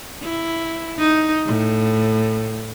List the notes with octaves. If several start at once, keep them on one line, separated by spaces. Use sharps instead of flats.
E4
D#4
A2